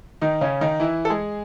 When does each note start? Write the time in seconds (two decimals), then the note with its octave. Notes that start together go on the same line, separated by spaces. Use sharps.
0.21 D#3 D#4
0.41 C#3 C#4
0.61 D#3 D#4
0.80 E3 E4
1.05 A4
1.10 G#3 G#4